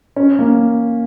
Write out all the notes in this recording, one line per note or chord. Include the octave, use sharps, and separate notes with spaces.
C#4
A#3